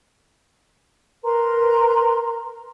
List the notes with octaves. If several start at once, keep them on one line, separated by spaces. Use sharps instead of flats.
A#4 B4 A#5 C6